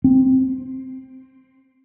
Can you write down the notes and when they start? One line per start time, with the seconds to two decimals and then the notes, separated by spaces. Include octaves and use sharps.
0.04 C4